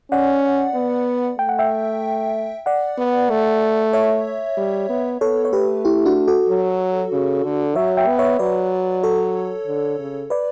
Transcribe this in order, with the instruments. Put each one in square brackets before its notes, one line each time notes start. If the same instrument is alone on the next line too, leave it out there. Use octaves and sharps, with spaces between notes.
[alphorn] C#4 [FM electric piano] D5 F#5
[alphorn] B3
[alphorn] A3 [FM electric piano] G5
[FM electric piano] F#5
E5 G5
D5 F#5
[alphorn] B3
A3
[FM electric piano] C#5 E5
[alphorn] G3
B3
[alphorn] B3 [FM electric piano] A4 C#5
[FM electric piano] C#5
[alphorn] A3 [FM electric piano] G4 B4
[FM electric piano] E4 G4
D4 F#4
F#4 A4
[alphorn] F#3
C#3
D3
[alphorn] F#3 [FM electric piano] C#5 E5
[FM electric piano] E5 G5
[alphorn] B3
[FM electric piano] C#5 E5
[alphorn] F#3 [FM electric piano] B4 D5
[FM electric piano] A4 C#5
[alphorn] D3
C#3
[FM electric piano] B4 D5